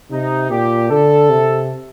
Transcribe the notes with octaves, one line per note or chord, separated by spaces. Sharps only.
C3 D#4
A#2 G4
D3 A4
C3